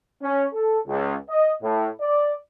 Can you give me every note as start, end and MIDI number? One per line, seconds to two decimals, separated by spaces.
0.22 0.45 61
0.53 0.79 69
0.86 1.15 37
1.29 1.51 75
1.62 1.87 45
2.01 2.33 74